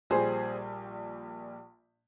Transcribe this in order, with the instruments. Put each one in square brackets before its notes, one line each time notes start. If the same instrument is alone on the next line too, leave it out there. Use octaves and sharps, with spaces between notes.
[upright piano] A#1 A#2 G3 G#4 C5